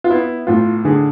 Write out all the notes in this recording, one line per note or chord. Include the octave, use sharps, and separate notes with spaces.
F4
B3 E4
A2 F4
D3 G#4